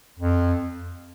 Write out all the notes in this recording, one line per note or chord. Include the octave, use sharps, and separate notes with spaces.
F2